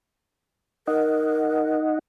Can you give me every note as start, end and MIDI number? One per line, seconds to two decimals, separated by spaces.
0.87 1.99 63
0.87 1.78 70
0.87 1.99 75
0.87 1.99 78